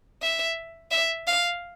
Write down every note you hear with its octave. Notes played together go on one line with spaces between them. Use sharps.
E5
E5
F5